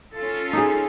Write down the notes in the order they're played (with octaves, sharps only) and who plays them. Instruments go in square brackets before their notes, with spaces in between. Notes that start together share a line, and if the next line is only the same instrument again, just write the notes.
[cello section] C#4 F4 A4
[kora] D#4 G#4